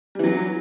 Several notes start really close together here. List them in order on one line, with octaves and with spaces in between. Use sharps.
G3 E3 F#3